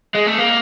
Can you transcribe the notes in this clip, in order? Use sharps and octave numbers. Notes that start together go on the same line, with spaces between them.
G#3
A3
A#3